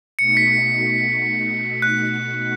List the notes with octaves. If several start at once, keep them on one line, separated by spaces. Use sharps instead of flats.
B2 A3 D#4 F#4 C#7
B6
F#6